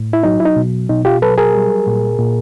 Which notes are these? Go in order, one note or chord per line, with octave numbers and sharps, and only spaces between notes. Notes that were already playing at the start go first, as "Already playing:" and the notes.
Already playing: A2
E4
F#3 D#4
E4
D#4
B2
B2 D#4
F4 G4
F#3 A4 B4
G#4 A#4
G3
A#2
A#2